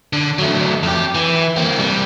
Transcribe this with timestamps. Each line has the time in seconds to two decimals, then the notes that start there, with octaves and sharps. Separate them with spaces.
0.13 D3
0.39 F#3 A3
0.83 F2 G4
1.15 E3
1.56 A#3 C4
1.78 C2 G3